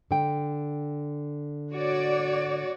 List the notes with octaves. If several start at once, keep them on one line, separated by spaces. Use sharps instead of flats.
D3 G5
F#4 C#5 D5